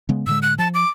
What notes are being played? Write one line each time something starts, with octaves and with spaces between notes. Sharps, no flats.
C#3 G#3 B3
A2 D3 G#3 E6
F#6
F3 A5
D6